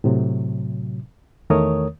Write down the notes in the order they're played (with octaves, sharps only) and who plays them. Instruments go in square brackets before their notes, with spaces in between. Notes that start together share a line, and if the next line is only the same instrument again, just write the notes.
[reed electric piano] A2 C3 F#3
E2 D#3 A3 A#4 C#5 D#6